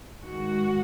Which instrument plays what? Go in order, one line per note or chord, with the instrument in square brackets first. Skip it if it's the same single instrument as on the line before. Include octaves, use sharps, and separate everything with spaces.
[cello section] G#2 D#3 G#3 F#4